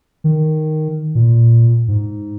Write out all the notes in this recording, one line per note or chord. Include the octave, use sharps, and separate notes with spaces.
D#3
A#2
G#2